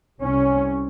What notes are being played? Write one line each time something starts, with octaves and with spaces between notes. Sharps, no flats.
C2 C3 C#4